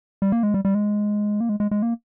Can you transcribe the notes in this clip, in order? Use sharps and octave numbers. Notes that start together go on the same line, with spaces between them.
G3
A#3
G#3
G3
G3
G#3
A#3
G#3
G#3
G#3
A#3